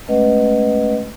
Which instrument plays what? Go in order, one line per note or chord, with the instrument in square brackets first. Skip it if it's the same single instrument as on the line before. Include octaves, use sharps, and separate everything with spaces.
[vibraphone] G#3 A3 C#4 B4 D#5 F#5